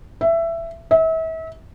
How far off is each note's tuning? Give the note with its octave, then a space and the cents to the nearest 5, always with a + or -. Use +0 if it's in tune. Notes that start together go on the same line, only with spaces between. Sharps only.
E5 +15
E5 -35